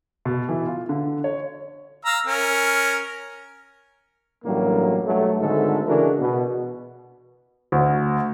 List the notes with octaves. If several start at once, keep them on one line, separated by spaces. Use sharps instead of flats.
B2
E3
F4
D3
C#5
F5 A#5 E6
C#4 A#4
A1 G2 F#3 G3 A#3 A4
B1 G2 F#3 A3
G#1 G#2 D3 G#3 A3 A4
C#3 E3 D4 F#4 G#4 A#4
B2
D2